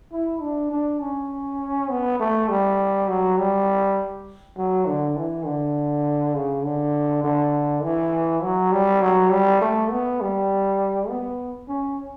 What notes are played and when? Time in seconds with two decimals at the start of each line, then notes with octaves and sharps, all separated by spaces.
0.12 E4
0.41 D4
0.71 D4
1.01 C#4
1.90 B3
2.19 A3
2.49 G3
3.08 F#3
3.38 G3
4.57 F#3
4.87 D3
5.16 E3
5.45 D3
6.35 C#3
6.64 D3
7.24 D3
7.83 E3
8.43 F#3
8.72 G3
9.01 F#3
9.31 G3
9.61 A3
9.91 B3
10.21 G3
11.09 B3
11.68 C#4